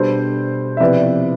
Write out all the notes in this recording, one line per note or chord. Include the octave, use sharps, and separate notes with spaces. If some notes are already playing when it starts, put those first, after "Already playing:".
Already playing: B2 G3 D4 A4 C5
E5
C3 F3 B3 E4 B4 D5